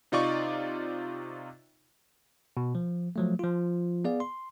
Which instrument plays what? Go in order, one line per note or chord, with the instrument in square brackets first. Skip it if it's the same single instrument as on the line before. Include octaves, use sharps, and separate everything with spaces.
[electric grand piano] C3 D#4 F4 D5 C#6
[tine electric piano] B2
F3
F3 F#3 A3
F3 F4
B3 G#4 D5 F5
C6